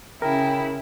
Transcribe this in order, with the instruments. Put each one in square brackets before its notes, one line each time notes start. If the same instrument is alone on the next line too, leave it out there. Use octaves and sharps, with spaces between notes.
[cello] C#3 [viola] E4 [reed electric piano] A#4 [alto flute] G5